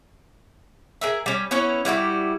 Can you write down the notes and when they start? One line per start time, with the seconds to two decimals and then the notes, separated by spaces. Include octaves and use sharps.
1.01 G#4 A#4 E5
1.26 G3 C#4
1.51 B3 C#4 E4 C#5
1.85 G3 E4 F#4 G4